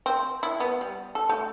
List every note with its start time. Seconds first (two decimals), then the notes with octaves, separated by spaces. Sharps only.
0.06 C4
0.43 E4
0.60 B3
0.81 G3
1.15 A4
1.29 A3